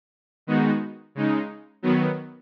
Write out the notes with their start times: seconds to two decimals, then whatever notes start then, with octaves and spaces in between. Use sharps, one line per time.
0.47 D#3 G#3 B3 D#4 F#4
1.15 C#3 G#3 D#4
1.82 D#3 F#3 B3